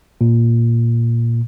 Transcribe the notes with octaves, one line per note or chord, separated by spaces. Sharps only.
A#2